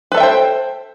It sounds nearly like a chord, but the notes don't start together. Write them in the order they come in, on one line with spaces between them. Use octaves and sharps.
B4 A4 E5 G5 C5